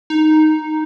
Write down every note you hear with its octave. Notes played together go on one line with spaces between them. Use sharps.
D#4